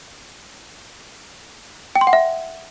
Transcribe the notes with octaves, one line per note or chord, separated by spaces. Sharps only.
G5
C6
F#5
E5